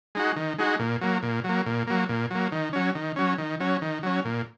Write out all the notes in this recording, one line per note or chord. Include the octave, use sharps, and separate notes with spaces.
G#3 D#4 F#4
D#3
G#3 D#4 F#4
A#2
F#3 A#3
A#2
F#3 A#3
A#2
F#3 A#3
A#2
F#3 A#3
D#3
F#3 C#4
D#3
F#3 C#4
D#3
F#3 C#4
D#3
F#3 C#4
A#2